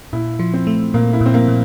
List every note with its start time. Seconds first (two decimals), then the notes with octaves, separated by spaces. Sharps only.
0.13 A#2 E4
0.39 F3
0.53 C4
0.67 A3
0.94 A#2 A#3
1.13 E4
1.21 A#2
1.26 C4
1.34 A#3
1.48 A#2